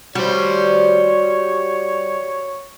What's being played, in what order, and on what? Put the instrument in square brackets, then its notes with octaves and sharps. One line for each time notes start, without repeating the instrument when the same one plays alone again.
[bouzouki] G3 [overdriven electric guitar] F#4 C5 [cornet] C#5